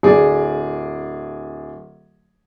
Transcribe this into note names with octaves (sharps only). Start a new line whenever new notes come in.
D1 G#4 D5